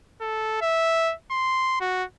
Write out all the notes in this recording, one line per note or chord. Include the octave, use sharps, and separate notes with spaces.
A4
E5
C6
F#4